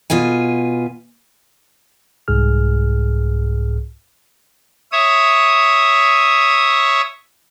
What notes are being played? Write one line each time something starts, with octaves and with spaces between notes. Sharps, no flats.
B2 F4 B4 G#5
C2 G#2 G#4 F6
C#5 E5 D#6